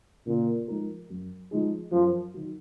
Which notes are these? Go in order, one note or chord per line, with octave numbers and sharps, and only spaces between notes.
A#2 C#3
F3 G#3 D#4 A#4
F#2
F3 G#3 D#4 G#4
F#2 F3
D#3 F#3